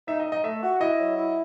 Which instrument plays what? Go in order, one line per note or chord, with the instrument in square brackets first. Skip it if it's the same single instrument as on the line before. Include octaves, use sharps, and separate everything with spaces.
[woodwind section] D#4 [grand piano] E5
[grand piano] D#5
[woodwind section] D#4
[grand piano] D#5
[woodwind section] A3 [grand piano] E5
[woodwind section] F#4
[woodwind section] E4 [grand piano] D#5
[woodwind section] F#3
E4